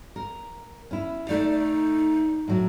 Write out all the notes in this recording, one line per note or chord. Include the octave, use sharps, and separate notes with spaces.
A#4
C#4 E4
A3 D#4 D5
A2 F#3